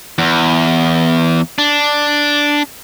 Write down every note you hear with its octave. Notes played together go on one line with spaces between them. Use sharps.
E2
D4